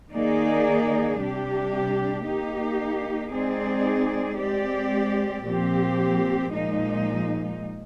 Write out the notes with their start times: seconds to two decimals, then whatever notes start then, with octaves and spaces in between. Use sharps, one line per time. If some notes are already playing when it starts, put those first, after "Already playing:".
0.12 D#3 A#3 D#4 G#4 D5
1.19 C3 G3 D4 G4
2.25 A#3 D#4 G4
3.31 G#3 C4 D#4 G#4 D5
4.37 G#3 C4 G4 D5
5.44 A#2 F3 C4 G4
6.51 A#2 F3 G#3 D#4